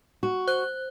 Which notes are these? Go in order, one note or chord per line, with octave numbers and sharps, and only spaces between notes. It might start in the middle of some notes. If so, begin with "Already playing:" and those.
F#4
C5 F#6